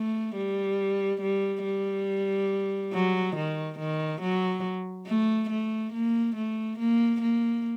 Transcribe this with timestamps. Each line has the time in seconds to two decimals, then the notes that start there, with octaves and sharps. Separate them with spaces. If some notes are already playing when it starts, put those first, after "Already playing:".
Already playing: A3
0.36 G3
1.22 G3
1.65 G3
2.93 F#3
3.36 D#3
3.79 D#3
4.21 F#3
5.07 A3
5.50 A3
5.93 A#3
6.36 A3
6.79 A#3
7.21 A#3